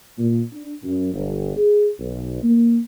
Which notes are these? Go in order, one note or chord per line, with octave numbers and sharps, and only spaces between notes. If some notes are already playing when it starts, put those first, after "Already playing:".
A#2
D4
F#2
G1
G#4
B1
A#3